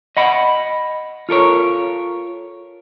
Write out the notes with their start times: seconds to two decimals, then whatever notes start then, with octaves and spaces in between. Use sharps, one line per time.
0.17 D#5 F#5 B5
1.29 F4 A4 A#4 C#5